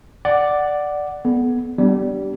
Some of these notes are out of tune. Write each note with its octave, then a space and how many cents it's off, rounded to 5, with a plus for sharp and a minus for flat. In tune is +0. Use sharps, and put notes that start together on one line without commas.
D5 +0 F#5 +5
B3 -5 A4 -40
G3 -20 B3 +5 D4 -10